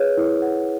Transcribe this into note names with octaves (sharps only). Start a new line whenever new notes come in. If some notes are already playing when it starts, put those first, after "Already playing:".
Already playing: G#4 B4 C#5
E4
F#5